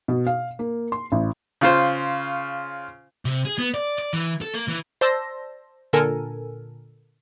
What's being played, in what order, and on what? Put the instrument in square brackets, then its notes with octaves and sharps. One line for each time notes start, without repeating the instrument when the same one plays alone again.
[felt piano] B2
F5
A#3
C6
A1
[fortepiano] C#3 F4 C5
[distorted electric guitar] C3
G#4
B3
D5
D5
E3
A4
A#3
E3
[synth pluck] C5 D5 A5 C6 E6 A#6
A#2 D3 A4 A#4 G#5